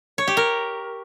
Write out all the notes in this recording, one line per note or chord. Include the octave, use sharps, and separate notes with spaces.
C#5
G4
A#4